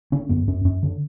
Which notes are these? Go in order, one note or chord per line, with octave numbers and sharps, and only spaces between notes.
D3 C#4
F#2 B3
F#2 C#4
F#2 C#4
D3